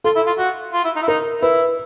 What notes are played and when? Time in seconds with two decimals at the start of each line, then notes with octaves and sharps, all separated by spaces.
0.04 F4 A4
0.16 E4
0.26 F4
0.38 F#4
0.73 F4
0.85 E4
0.96 D#4
1.02 E4
1.08 D#4 A#4
1.42 E4 B4